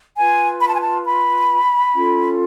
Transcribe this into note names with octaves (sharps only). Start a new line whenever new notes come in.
F4 B4 G#5
B5
A5
G#5
A5
B5
C#4 F4 A4